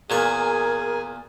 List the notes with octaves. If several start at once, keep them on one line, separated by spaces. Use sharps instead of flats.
E2 A#2 G#4 A#4 G#5 C#6